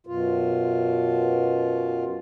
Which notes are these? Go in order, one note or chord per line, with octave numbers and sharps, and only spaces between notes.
F#2 B2 F4